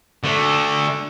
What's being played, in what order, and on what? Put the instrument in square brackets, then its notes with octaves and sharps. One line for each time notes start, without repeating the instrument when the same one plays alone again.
[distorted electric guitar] D3 A3